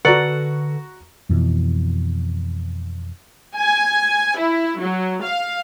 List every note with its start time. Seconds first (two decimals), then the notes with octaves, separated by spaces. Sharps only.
0.05 D3 F#4 A4 B4 D5 F#5 A#5 C#6
1.30 F2 B2 E3
3.56 G#5
4.38 E4
4.80 F#3
5.22 F5